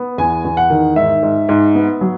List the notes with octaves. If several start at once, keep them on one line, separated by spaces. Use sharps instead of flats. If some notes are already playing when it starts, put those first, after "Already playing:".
Already playing: B3
E2 G#5
E2
F#5
D#3
G#2 E5
G#2
G#2
B3
F#3